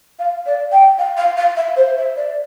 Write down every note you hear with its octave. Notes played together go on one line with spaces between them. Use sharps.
F5
D5
G5
F5
F5
F5
E5
C5
E5
D5